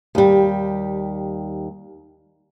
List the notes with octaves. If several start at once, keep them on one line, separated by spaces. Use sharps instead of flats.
D#2 G3